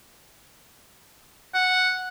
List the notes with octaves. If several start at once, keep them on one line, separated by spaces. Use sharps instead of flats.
F#5